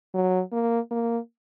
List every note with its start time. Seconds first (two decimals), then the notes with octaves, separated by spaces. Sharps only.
0.14 F#3
0.52 A#3
0.91 A#3